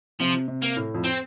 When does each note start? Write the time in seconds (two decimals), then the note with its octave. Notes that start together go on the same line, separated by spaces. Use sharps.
0.20 C3 F3
0.48 C3
0.62 A#3
0.76 A2
0.94 F2
1.04 C4